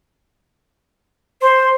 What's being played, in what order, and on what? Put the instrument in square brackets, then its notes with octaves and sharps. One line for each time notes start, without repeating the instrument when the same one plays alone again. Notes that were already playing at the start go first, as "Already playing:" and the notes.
[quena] C5 [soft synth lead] C6